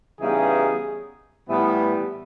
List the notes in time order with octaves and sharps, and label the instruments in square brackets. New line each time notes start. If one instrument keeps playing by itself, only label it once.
[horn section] C#3 E3 G3 B3 D#4 G#4
A2 E3 G3 B3